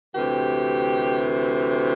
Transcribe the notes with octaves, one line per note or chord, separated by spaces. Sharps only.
D2 C3 E3 G4